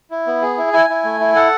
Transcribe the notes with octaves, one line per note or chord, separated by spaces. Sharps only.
E4
B3
G#4
E4
E4 G#5
E4
A3
E4
A4 F#5